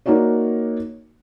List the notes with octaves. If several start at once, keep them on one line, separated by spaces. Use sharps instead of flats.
A#3 D#4 F#4 C#5 D5